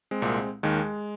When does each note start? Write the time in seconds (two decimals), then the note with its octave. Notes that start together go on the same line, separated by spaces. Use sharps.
0.11 G#3 C4
0.22 C2 A#2
0.63 D#2 D#3 G#3